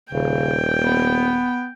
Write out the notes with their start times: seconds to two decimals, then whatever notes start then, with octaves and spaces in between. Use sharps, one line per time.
0.13 D#1 C#3 G5
0.82 B3